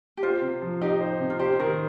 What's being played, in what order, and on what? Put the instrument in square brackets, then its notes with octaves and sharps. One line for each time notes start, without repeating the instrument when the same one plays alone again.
[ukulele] G4
[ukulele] F4 [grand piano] C5
[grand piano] C3
F3
[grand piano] D#4 [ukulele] G4
[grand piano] C5
C3
[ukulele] F4
[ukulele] G4 [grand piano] C5
[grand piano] D#3 [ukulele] A#4